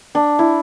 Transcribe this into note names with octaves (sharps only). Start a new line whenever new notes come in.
D4
E4